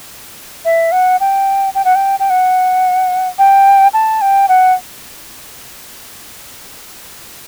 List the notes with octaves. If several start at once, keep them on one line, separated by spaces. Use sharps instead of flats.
E5
F#5
G5
G5
F#5
G5
G5
F#5
G5
A5
G5
F#5